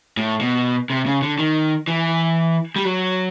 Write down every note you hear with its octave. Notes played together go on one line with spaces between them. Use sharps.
A2
B2
C3
C#3
D3
D#3
E3
G3
F#3